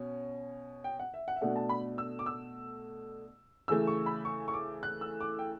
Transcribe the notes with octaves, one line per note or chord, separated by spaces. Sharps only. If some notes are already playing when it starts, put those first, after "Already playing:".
Already playing: B2 C#4
G5
F#5
E5
F#5
E5
B2 A3 D4 F#5
A5
B5
E6
D6
E6
C#3 E3 A3 E6
C#6
B5
C#6
C#6
D6
F#6
E6
D6
G5